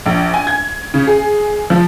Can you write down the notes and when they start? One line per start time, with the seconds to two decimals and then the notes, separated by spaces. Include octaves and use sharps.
0.06 A#1
0.34 G#5
0.47 G#6
0.94 C#3
1.07 G#4
1.70 F3